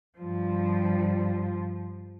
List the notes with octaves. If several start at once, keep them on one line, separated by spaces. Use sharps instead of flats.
G2 F3